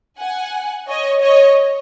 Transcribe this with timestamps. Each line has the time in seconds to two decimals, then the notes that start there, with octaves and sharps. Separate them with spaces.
0.19 F#5 G#5
0.88 C#5 D#5
1.22 C#5 D#5